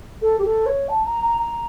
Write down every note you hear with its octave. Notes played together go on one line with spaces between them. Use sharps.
A4
G4
A4
C#5
A5
A#5
A#5
A#5